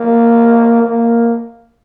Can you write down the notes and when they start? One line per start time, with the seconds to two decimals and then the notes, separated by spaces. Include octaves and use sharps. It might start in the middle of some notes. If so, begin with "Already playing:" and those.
Already playing: A#3
0.82 A#3